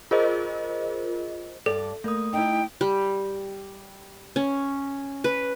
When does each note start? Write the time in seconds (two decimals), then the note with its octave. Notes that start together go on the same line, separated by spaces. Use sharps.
0.11 F4 G#4 A#4 C5 D#5
1.66 G2 A4 D5
2.04 A3 A#3 D#6
2.33 D#4 E4 G5
2.81 G3
4.36 C#4
5.24 B4